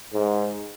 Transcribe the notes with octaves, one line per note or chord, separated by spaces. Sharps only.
G#2